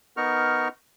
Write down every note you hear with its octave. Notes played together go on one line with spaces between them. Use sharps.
B3 D#4 A#4 C#6 F6